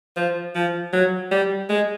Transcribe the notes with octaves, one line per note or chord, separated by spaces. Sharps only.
F3
F3
F#3
G3
G#3